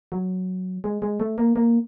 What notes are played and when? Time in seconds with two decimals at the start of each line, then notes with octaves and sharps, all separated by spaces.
0.12 F#3
0.84 G#3
1.02 G#3
1.20 A3
1.38 A#3
1.56 A#3